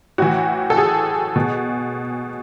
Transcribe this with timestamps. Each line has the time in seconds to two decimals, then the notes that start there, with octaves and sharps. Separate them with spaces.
0.18 A2 E3 F#4
0.70 A4
0.77 G#4
1.36 B2